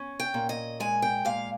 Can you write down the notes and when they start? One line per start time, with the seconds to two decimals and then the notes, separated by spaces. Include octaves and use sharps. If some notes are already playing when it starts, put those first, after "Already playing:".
Already playing: C#4
0.20 G5
0.34 A#2
0.49 D#5
0.80 G#3 G#5
1.02 G5
1.25 A#2 F5